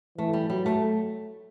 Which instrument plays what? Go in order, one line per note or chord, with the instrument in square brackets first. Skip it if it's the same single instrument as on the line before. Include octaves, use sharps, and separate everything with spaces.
[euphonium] E3 [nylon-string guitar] A3
[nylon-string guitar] G3
[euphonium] F#3 [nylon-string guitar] G3
[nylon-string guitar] A3